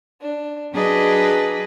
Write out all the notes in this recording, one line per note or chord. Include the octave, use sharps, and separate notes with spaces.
D4
F#3 D4 G#4 B4 D#5